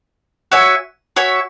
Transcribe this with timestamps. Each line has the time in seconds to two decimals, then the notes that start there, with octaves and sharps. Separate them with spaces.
0.52 F#4 C#5 E5 G#5
1.16 F#4 C#5 E5 G#5